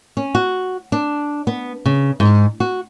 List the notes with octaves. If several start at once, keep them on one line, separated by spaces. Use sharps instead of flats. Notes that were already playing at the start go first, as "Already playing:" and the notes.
C#4
F#4
D4
B3
C#3
G#2
F#4